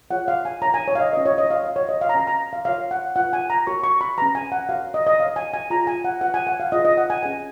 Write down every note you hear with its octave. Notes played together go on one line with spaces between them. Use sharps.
F4 G#4 C#5 F#5
F5
G#5
D#4 A#4 C#5 A#5
G#5
C#5
F5
D#5
C#4 F4 B4 D#5
C#5
D#5
F5
F#4 C#5 F5
C#5
D#5
F5
A#5
C#4 F#4 A#4 C#5 G#5
A#5
F5
F4 A#4 C#5 F5
F#5
F4 B4 F#5
G#5
A#5
F#4 A#4 C#5 C#6
C#6
B5
C#4 G#4 B4 A#5
G#5
F#5
F#4 A#4 C#5 F5
D#5
D#5
F#4 C#5 F5
G#5
G#5
F4 G#4 C#5 A#5
G#5
F#5
F4 B4 F#5
G#5
F#5
F5
F4 G#4 B4 D#5
D#5
F#5
G#5
C#4 G#4 B4 G#5